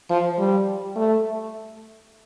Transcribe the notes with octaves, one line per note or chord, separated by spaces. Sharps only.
F3
G3
A3